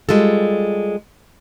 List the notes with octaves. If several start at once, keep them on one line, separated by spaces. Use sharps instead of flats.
G3 G#3 F4 A4